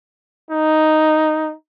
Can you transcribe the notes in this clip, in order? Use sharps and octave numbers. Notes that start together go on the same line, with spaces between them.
D#4